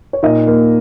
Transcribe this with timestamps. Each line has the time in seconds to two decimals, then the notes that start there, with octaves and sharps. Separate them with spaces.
0.13 C#5
0.23 A#2 D#4 D#5
0.47 A#3